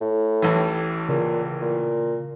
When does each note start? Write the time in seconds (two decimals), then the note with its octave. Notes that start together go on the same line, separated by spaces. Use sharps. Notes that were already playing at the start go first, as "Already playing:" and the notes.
0.01 A2
0.42 A1 E3
1.09 A#2 C#3
1.61 A#2